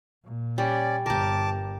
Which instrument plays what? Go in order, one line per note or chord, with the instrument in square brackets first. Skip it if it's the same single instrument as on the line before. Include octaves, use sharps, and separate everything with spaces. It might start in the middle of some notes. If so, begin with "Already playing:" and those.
[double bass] A#2
[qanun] G3 [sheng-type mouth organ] C#4 D5
[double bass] G1 [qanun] G4 A#4 [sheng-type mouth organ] A5 D6